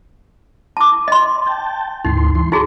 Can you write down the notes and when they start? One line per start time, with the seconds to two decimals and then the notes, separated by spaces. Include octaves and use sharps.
0.77 A5 D6
1.08 D#5 C6
1.47 G5 A5
2.05 D2 G#2 D#4 C6
2.35 E3 C6
2.52 D#4 F#4 G#4 A4 A#5 C#6